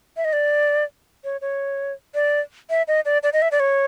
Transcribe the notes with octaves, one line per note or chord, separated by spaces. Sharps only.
E5
D#5
D5
C#5
C#5
D5
E5
D#5
D5
D5
D#5
E5
D5
C#5